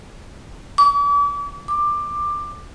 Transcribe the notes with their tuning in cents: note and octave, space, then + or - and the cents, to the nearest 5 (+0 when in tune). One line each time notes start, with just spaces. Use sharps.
D6 -40
D6 +15